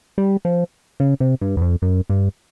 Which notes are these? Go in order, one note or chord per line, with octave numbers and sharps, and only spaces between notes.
G3
F3
C#3
C3
G2
E2
F2
F#2
G2